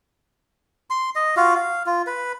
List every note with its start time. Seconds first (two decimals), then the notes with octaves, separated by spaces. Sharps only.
0.90 C6
1.15 D#5
1.36 F4 F#4 F5
1.55 F5
1.86 F4
2.07 B4